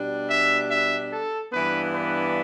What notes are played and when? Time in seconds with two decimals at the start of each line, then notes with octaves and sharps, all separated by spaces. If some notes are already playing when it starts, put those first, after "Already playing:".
Already playing: B2 G3 D4
0.30 E5
0.71 E5
1.11 A4
1.52 G2 E3 B3 D4 B4
1.93 B4